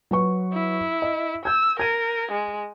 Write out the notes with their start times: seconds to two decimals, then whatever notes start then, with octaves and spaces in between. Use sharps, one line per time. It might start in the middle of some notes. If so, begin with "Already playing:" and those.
0.11 F#3 B4 C#6
0.53 E4
1.02 D#5
1.45 E6 G6 G#6
1.80 A#4 G#6 D#7
2.32 G#3